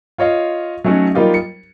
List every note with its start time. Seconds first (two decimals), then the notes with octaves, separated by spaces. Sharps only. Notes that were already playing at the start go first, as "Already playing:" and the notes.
0.18 F4 C#5 D#5 F5
0.84 F#3 A3 C#4 D#4 F#4
1.15 F#3 G3 A#3 D#4 F4 G4
1.34 C#7